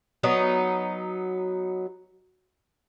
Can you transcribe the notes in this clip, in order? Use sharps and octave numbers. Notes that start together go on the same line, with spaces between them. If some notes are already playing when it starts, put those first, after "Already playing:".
F#3 B3 D#4